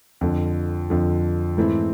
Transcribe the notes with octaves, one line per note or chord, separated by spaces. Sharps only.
F2 D3 F3
F2 D3 F3
G#2 E3 A3 C4 E4